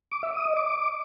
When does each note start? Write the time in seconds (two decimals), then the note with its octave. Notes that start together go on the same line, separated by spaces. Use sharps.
0.12 D6
0.23 E5
0.34 D#6
0.45 D#5
0.57 D6